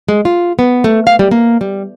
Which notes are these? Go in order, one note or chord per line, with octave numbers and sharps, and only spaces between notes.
G#3
F4
B3
A3
F5
G3
A#3
G3